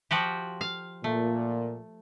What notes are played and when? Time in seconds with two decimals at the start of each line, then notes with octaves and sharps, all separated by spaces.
0.11 F3 F#4 G4
0.61 F5
1.04 A#2 A3